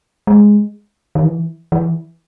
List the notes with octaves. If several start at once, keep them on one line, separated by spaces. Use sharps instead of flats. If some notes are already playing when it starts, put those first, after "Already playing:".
G#3
D#3
E3
E3